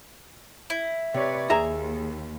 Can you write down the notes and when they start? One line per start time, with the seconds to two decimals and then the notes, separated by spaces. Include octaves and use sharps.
0.70 E4
1.14 C3 B4 C#5 D5
1.50 D#2 G#4 E5 A#5